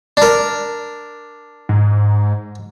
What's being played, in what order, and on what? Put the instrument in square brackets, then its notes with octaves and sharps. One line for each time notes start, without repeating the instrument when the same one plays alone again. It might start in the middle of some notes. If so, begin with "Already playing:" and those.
[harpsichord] D4 A#4
[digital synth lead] G#2